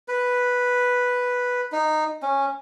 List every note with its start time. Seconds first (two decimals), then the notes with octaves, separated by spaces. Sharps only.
0.08 B4
1.72 D#4
2.22 C#4